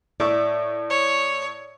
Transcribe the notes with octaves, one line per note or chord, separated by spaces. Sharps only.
A2 D5 E5 C#6
C#5